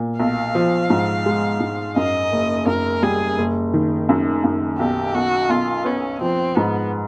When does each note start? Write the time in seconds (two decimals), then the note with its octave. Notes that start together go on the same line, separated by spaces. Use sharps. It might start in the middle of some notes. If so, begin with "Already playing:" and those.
Already playing: A#2
0.19 B1 F5
0.55 F3
0.90 G#2
1.26 G#3
1.60 G#2
1.96 F#2 D#5
2.32 F#1
2.66 F#2 A#4
3.03 G3 G#4
3.38 F#1
3.74 D#3
4.09 F#2
4.44 F#2
4.79 B1 G4
5.14 B1 F#4
5.49 B1 F4
5.85 B3 C#4
6.21 F3 C4
6.55 G#2 B3